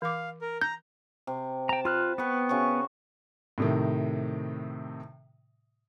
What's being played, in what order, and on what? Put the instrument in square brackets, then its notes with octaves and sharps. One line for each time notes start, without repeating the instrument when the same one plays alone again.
[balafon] E3 D6 [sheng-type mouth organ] F5
[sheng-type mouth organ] A#4
[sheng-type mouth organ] A#5 [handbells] G6
[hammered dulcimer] C3
[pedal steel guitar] G5 A#5 [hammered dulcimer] A5
[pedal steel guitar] F4 F6 F#6 [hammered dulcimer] B4
[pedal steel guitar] B3 [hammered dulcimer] B4 G5 C#6
[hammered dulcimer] C#3 F#4 C#6
[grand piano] A2 C3 D#3